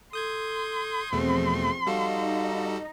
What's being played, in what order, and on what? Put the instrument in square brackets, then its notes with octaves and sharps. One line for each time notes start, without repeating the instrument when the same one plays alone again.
[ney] A4 [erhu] C6 [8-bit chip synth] D#6 G6 G#6
[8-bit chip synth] E2 B2 A3 [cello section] F3 C4 [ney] G#4
[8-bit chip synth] G3 F#4 A4 [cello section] D#4 [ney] F5